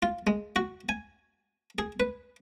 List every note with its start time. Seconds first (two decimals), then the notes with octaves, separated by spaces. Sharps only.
0.03 F4
0.27 G#3
0.56 F#4
0.89 G#5
1.78 G#4
2.00 B4